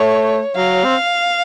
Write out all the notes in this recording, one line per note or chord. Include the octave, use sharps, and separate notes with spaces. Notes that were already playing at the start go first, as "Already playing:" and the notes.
Already playing: A3 C#5
F#3 F5
C4